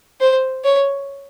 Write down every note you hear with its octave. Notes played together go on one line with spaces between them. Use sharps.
C5
C#5